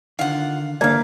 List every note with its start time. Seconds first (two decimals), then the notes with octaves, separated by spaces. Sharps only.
0.19 D3 D#3 F4 F#5
0.81 G2 D3 E3 A#3 D5 F5